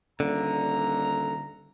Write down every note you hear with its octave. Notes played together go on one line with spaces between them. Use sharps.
D#1 D3 A#5